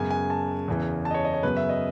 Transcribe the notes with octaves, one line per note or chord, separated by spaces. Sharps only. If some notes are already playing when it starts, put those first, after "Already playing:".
Already playing: F#2 C#3 G#3 B3 G#5
G#5
A5
E2 C#3 E3
A5
D#5
C#5
D#5
C#5
F#2 C#3 F#3 B3 B4
E5
D#5